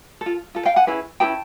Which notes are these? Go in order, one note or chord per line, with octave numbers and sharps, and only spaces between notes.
A4
F4
F4 A4
F5 G5
F#5 G#5
C#4 E4 G#4 B4
C#4 E4 G#4 B4 G5 A5